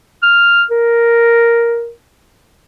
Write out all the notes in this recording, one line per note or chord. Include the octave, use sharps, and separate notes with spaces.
F6
A#4